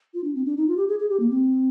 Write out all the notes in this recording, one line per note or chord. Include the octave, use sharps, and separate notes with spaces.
F4
D4
C4
D4
D#4
F4
G4
G#4
G#4
G4
A#3
C4